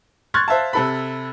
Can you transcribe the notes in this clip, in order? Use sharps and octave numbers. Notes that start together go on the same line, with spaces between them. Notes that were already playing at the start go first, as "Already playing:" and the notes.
C6 C#6 F6 F#6 G#6 A6
C5 E5 F5 A5
C3 A4 B5